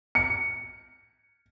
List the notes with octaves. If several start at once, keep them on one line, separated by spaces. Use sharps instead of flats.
C#7